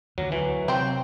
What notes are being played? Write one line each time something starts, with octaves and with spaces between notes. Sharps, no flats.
D2 D3 F#3
E3 F#3
C3 C4 C5 G5